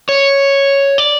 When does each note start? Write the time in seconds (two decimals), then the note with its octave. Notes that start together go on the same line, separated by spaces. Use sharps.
0.09 C#5
0.98 D5